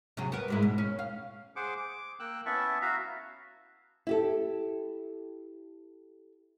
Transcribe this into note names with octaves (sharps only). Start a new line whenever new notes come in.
C3 F#3 G#4
B3 A#4
G#2 G#3 E4
B2
C#4
F5
G#4 C5 F#5 D6
D6
A#3 G5 E6 F#6
B3 C#4 E4 E5 A5 C#6
F#4 E5 F5 A#5
E4 G4 A4